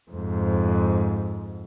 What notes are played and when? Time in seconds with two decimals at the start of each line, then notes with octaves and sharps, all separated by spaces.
0.11 F2 G#2